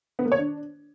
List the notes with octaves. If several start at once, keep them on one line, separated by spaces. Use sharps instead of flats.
B3
A#3
C#5
D4